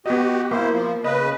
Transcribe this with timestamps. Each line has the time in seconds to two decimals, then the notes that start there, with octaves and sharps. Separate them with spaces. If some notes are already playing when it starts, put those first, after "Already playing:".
0.06 B3 F#4 G4 D#5
0.51 A#3 E4 C5
0.72 F3
1.04 C#3 B4 D#5